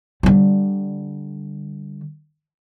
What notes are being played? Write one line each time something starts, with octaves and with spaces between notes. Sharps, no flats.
D3 G3